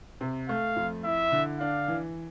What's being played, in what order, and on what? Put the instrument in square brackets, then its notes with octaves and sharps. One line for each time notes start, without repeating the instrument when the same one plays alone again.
[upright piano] C3
[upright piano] A3 [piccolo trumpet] F5
[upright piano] F2
[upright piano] E4 [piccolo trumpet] E5
[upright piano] D3
[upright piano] D4 [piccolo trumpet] F5
[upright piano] E3